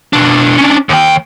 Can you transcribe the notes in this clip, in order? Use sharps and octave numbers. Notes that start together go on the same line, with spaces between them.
B2 D4
C#4 D4
D#2 G5